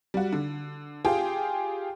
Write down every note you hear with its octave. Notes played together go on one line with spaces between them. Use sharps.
G3 F#4
D3
F4 G4 G#4 G5